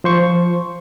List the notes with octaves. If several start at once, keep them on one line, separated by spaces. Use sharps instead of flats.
F3 C5 C#6